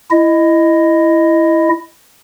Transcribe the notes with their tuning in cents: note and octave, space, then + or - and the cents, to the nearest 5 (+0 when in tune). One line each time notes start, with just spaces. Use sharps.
E4 +10 D#5 +0